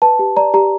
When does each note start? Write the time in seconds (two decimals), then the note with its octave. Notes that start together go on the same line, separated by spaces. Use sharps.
0.02 B4 A5
0.19 G4
0.37 D5 A#5
0.54 G4 A#5